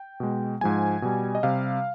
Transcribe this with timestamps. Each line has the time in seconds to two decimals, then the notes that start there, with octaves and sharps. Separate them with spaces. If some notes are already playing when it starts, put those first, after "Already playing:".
Already playing: G5
0.20 B2 G#3
0.61 G#2 F3 G#3 G#5
1.02 B2 G3
1.35 D#5
1.43 C3 G3 F5